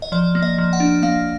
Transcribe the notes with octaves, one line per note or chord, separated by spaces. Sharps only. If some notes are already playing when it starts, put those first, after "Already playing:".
D#5
F3 D5
A#3
D#5
F3
F#5
D4
A#3 F5